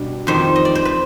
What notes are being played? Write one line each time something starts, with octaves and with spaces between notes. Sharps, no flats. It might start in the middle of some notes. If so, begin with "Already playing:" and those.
Already playing: B2 G3 D4
F2 D#3 G3 C5
D#5
D5
C5
B4